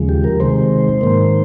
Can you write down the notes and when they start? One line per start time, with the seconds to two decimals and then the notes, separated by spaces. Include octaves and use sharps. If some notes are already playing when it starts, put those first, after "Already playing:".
Already playing: D#2 C#3 F3 G#3
0.09 G4
0.24 A#4
0.40 C3 D#3 G#3 C5
1.01 G#2 D#3 A#3